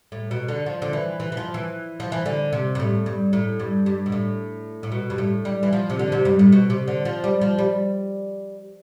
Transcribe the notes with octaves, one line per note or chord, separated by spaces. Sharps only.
A2
B2
D3
F3
D3
E3
E3
E3
F3
E3
F3
E3
D3
C3
G2
A2
G2
A2
G2
G2
B2
A2
A2
B2
G2
A2
G3
E3
F3
C3
D3
C3
G2
A2
B2
C3
D3
F3
G3
F3
G3